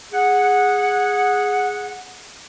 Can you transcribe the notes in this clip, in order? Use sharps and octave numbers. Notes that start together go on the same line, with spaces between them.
G#4 F#5